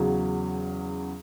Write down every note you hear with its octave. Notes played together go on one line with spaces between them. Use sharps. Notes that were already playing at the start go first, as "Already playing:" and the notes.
Already playing: E2 C#3 F#3